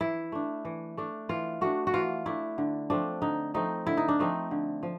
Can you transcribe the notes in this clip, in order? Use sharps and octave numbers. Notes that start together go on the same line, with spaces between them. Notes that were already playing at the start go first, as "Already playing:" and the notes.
E3 E4
A3 D4
E3
A3 D4
E3 F4
A3 D4 F#4
F#4
E3 F4
A3 D4 E4
D3
F3 A3 C4 D4
D3 D#4
F3 A3 C4 D#4
D3 E4
D#4
D4
F3 A3 C4 D#4
D3
F3